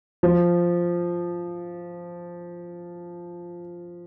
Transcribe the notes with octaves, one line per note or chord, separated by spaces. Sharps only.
F3